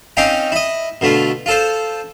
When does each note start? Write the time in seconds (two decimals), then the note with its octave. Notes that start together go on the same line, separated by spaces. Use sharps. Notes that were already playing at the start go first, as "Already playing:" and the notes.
0.17 C4 C#4 D#4 F5 G5
0.52 E4 D#5
1.01 B2 D3 A3 F4
1.46 F4 A4 C5